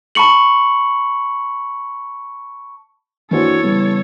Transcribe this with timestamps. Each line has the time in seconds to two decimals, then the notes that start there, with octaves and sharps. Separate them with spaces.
0.15 A5 B5 C#6 C#7 F#7
3.31 E3 A#3 D4 F#4 A4 C5 C#5
3.63 C#3 G3 B3